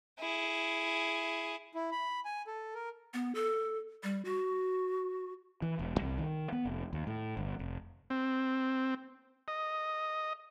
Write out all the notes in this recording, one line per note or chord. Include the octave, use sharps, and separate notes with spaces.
E4 G#4
E4
B5
G#5
A4
A#4
B3
A4
G3
F#4
E3
E1
C2
D#3
B3
F1
D#2
A2
G1
F1
C4
D#5